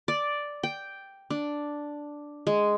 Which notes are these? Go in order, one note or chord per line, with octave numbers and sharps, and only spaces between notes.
D5
G5
D4
G#3